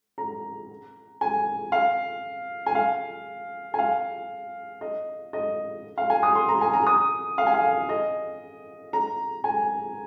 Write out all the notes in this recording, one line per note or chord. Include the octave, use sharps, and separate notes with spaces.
A#5
G#5
F5
G#5
F5
G#5
F5
D#5
D#5
F5
G#5
D#6
C6
A#5
G#5
A#5
D#6
F5
G#5
F5
D#5
A#5
G#5